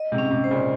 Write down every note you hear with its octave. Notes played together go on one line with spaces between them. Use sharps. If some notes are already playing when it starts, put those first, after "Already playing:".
Already playing: D#5
G#2 C3
C#4
G#2 C3
C5
A#2 C#3